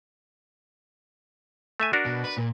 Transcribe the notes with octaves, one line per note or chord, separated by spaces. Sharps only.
A3 E5 G#5
D4 F#4 A#4
B2
B4
A#2